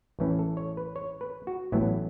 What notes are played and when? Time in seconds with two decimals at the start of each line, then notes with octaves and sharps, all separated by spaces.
0.19 A1 A2 E3 C#4 B4
0.39 A4
0.57 C#5
0.77 B4
0.96 C#5
1.21 B4
1.47 F#4
1.72 A1 A2 F#3 B3 E4